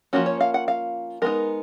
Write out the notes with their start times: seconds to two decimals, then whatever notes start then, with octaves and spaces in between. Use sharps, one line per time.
0.13 F3 A#3 C#4 F#4
0.26 C#5
0.41 F5
0.54 F#5
0.68 F5
1.22 G#3 B3 D#4 A#4